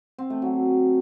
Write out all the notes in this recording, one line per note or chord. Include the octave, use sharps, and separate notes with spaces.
C4
A3
F#3